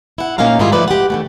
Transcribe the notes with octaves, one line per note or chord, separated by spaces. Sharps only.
E4 F#5
A#2 A#3 C#4 D#4 F5 A#5
G#2 D#3 G3 E4 F4 G#4
F3 A3 E4 B4 D5
G4 F#5
D3 E3 A3